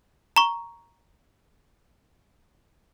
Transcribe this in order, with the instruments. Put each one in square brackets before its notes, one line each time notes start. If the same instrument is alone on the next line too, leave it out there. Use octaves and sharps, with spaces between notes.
[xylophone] A#5 C#6